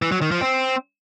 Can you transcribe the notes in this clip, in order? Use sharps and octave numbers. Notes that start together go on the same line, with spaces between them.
E3
F#3
D#3
F3
C4